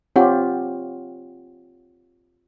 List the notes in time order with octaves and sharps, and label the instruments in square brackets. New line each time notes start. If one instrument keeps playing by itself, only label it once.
[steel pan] C4 F4 G4 [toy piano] C#5 F#5 C#6